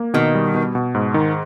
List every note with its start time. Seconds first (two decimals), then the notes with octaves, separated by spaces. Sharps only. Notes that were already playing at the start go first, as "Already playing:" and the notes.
Already playing: A#3
0.14 B2 D#3
0.35 G3
0.54 B2
0.75 B2
0.95 G#2
1.14 D#3